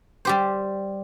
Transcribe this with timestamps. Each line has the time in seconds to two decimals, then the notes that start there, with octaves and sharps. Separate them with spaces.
0.25 G3 G4 C5